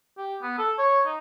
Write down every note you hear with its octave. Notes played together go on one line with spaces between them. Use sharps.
G4
B3
A4
C#5
D#4